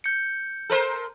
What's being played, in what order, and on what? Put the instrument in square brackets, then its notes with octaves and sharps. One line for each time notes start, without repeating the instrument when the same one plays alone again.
[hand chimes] G6 C#7
[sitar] A4 A#4 C5